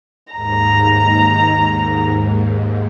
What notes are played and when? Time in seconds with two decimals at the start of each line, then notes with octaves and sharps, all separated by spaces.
0.32 D#2 G#2 A#5